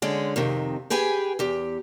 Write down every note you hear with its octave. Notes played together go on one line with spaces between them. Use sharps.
D3 G#3 C#4
F2 C3 D#3
G4 G#4 B4 G5 G#5
E2 G4